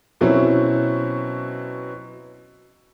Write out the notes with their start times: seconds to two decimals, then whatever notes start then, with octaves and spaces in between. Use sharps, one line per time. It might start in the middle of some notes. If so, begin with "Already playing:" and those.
0.21 B2 F#3 C4 C#4 E4